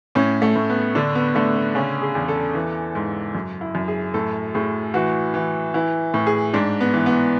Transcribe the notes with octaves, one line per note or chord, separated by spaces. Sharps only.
A2 C#4
A3
A2
B3
D3 D4
B3
D3 A3
B3
C#3 C#4
G#4
E2
A4
E3
G#2
F#2
E4
F#2
G#4
A2 A4
A2 G#4
E3 F#4
E3
E3 E4
A2
G#4
G#2 D4
B3
E3
B3